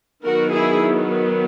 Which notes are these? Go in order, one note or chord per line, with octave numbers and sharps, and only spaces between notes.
D#3 F#3 B3 F#4 A#4
E4 G#4